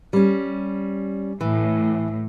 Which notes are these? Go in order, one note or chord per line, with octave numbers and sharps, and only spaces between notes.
G3 C#4
A2 E3